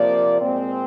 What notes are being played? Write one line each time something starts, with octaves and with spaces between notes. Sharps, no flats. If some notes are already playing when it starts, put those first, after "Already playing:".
Already playing: C3 F3 A#3 D5
A#2 G#3 C4